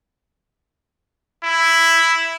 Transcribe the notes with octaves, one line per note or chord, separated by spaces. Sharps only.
E4